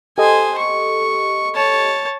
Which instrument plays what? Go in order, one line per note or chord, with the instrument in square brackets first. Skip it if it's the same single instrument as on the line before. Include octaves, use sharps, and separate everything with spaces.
[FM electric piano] G4 A4 D#5 [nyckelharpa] C5 G#5
[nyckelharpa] C#6
C#5 A5